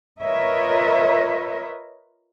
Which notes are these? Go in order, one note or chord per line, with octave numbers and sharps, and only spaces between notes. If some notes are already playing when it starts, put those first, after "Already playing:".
F4 A#4 B4 C#5 D#5 E5